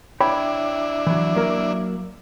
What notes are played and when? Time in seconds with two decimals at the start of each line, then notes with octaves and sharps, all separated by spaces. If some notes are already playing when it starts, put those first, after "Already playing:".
0.21 D4 E4 C#5 G5 B5
1.07 E3 F#3
1.35 F#3 A#3 A#4